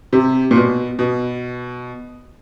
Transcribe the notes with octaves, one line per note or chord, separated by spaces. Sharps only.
C3
A#2
B2
B2